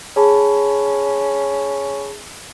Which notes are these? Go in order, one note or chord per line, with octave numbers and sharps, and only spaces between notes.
C#4 G#4 A5 B5